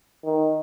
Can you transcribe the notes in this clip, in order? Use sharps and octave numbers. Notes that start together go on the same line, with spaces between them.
D#3